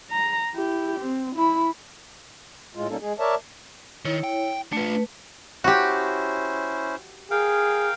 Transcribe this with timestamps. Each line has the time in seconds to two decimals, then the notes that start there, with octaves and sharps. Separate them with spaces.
0.11 A#5
0.54 E4 G4
1.00 C4
1.36 E4 B5
2.75 A2 G#3 F4
2.89 B2 G3 A#3 C#4 D#4 A4
3.01 G#3 G#4
3.19 A#4 C#5 D5 E5 A5
4.05 D#3 E4 C#5
4.24 G5
4.73 A3 D4 F4 B4
5.64 C#4 E4 F#4 G4 C5
7.31 G#4 A#4 F5 G5